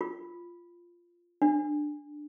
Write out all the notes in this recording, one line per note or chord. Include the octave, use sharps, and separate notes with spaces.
F4
D4